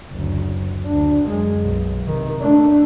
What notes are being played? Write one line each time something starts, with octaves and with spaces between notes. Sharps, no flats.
F#1 D2
D2 D4
F#2 G#3
B1
C3 D#3
A3 D4